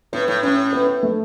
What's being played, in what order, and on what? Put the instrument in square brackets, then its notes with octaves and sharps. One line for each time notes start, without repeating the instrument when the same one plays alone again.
[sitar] A2 [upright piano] B3
[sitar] A2
[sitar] A2 [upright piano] C#4
[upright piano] B3
A3